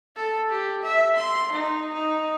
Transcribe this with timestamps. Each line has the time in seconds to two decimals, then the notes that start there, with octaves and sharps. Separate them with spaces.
0.16 A4
0.50 G4
0.82 E5
1.16 C6
1.52 D#4
1.93 D#4